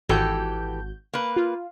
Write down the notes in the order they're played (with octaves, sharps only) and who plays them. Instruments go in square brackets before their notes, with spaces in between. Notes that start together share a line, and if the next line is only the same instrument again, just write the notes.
[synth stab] G#1 F#4 G6 [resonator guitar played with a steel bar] E3 G4 A4
[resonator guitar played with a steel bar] A#3 B4
[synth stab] F4